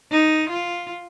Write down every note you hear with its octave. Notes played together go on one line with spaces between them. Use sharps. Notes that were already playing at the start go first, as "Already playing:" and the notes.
D#4
F4